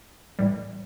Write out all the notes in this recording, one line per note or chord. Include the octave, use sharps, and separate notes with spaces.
A2 E3 G3